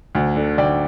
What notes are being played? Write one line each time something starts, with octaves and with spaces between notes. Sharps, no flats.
D2
D3
D2 D5 G5